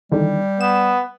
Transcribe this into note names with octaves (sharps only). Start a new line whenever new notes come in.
E2 D3 D#3 G3
B3 E7